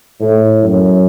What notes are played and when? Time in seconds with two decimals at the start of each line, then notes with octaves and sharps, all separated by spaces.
0.20 A2
0.63 F#2